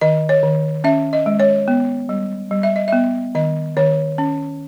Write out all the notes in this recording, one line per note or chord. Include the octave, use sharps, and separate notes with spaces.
D#3 D#5
C#5
D#3
C#4 E5
D#5
G#3
C#5
B3
G3
G3
E5
D#5
B3 E5
D#3 D#5
D#3 C#5
C#4